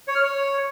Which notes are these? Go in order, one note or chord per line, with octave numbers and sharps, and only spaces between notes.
C#5
F6
C#5